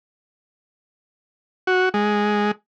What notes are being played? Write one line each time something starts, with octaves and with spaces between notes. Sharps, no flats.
F#4
G#3